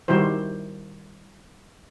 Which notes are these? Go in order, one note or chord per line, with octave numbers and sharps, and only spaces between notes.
D#3 G3 E4 F#4 C5